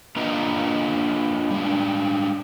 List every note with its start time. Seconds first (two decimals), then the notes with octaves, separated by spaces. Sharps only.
0.16 A#3 D4 F4 B4 D#5 A#5
1.51 G3 G#3 D4